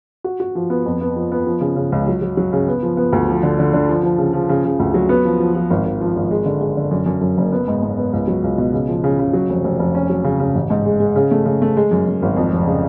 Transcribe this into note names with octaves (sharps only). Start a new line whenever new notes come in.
F#4
F#4
F3
B3
F2
B3
F3
B3
F3
C#3
C#3
C#2
F#3
F#3
F#3
C#3
B3
F3
B3
D2
F3
D3
D3
D3
F3
F3
C#3
F3
C#3
C#3
D2
F#3
B3
F3
F3
F3
G#1
G#1
F3
G#1
G#3
D3
G#3
D3
F#2
F#2
F#2
F#1
B3
G#2
G#2
B3
C#2
F#3
C#2
B2
C#3
F3
C#3
C#3
F#3
F1
F1
F1
C#4
F#3
C#3
C#3
A1
G#2
G#3
G#3
C#3
A3
C#3
A3
G#3
F#2
F#2
G#1
F2
F1
C#3